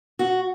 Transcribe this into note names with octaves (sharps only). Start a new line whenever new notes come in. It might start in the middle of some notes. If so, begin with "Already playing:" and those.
F#4